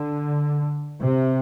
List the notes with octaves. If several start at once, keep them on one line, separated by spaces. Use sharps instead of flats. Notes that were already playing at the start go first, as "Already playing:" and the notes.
Already playing: D3
C3